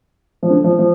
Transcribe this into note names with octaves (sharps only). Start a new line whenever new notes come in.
F3
D3
F3
F3